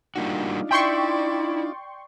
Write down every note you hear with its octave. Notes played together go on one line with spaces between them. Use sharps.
G3 A#3 D4 D#4 F4 F#4
E4 D5 G5 C6 C#6